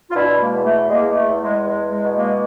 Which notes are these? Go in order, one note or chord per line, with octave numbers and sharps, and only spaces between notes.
F4
B2 D4 E4
G#3 A#3
E2
A3
E2 G#3 A#3
A3
E2
G#3
E2 G#3
G#3
B2
G#3 A#3